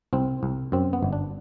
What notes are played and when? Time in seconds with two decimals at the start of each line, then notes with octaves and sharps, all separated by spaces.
0.13 C2 C4
0.43 C2
0.72 F#2 C4
0.93 B3
1.03 G1
1.13 D4